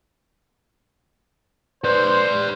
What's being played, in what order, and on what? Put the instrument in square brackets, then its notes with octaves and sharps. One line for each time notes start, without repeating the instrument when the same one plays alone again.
[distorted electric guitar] B4 D5 [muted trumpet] C5